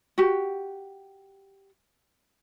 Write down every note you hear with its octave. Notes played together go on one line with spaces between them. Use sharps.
F#4 G4